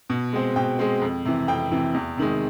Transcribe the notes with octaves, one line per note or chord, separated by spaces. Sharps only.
B2
G#3 C4
B2 G5
G#3 C4
F2
C3 E3
F2 G5
C3 E3
E2
C3 D#3 G#3